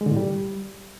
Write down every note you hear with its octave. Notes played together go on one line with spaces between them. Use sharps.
G#3
D3
A2
G3